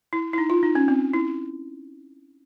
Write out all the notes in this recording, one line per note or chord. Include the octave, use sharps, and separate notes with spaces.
E4
E4
D#4
F4
D#4
C#4
C4
E4